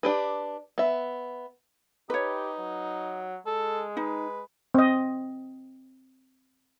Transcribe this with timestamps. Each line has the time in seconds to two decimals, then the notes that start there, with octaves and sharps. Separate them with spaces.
0.03 D4 G4 B4
0.78 B3 E5
2.10 D#4 G4 B4 C#5
2.60 F#3
3.46 G#3 A4
3.97 D#4 B4
4.74 C4 D#5